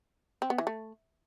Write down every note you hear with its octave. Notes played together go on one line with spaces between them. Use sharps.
C4
B3
E3
A3